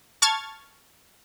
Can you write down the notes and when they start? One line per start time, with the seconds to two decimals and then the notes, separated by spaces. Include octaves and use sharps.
0.22 A5 C#6 F6 G#6 A6